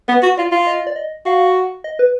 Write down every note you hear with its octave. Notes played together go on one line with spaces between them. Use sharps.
B3 B4
F#4
F4 D5
F4
D#5
D5
D#5
F#4 F5
D#5
B4